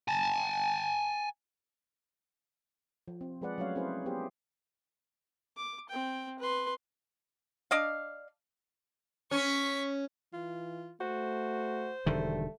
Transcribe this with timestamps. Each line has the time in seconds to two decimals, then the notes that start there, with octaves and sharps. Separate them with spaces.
0.08 G#5 A5
3.08 F3
3.21 C4
3.42 F3 G#3 G#4 B4 D5 F#5
3.58 F#3 A3 C#4 C#5 F5
3.76 C4 C#4 E4 G#4 B4 C5
4.06 B3 G4 G#4 C5
5.56 D6
5.89 C4 G5
6.39 B4 C6
7.71 D4 D5 D#5 F5
9.31 C#4 C#6 B6
10.33 E3 F4
11.01 A3 F#4 C5
12.06 E1 D3 D#3 G3 A3